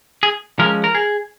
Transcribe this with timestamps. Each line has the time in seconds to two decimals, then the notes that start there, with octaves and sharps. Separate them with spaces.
0.23 G#4
0.59 F3 G#3 C#4 A#4
0.84 A#4
0.95 G#4